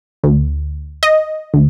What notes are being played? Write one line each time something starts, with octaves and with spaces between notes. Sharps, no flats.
D2
D#5
D2